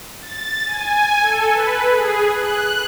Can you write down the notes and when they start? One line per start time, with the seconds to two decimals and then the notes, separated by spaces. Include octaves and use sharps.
0.21 A6
0.65 G#5
1.21 A4
1.53 B4
1.92 G#4
2.30 F#6